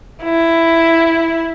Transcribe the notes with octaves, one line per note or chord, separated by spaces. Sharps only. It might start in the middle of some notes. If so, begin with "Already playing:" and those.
E4